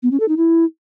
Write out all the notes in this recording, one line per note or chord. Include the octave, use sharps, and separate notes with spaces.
B3
C#4
A4
D#4
E4